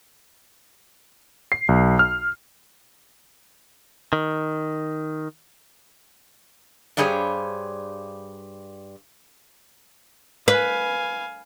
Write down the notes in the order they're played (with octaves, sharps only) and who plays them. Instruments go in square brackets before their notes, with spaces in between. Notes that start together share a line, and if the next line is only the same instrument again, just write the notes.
[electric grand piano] C7
B1
F6
[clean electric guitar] D#3
[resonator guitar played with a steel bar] G2 G3 G4 G#4 C5 C#5
[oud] B4 [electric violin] F5 G#5